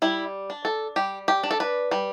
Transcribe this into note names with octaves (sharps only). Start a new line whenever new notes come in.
G3 E4
D4
A4
G3 G4
G4
D4
A4
B4
G3